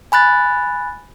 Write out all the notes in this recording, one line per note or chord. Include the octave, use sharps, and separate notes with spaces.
G#5 B5 F#6 A6